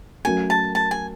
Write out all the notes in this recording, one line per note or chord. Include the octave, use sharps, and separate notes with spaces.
F#3 A3 C#4 F#4 A#4 G#5
A5
A5
G#5